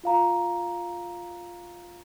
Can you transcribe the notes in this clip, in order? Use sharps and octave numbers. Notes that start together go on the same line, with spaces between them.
F4 F5 A#5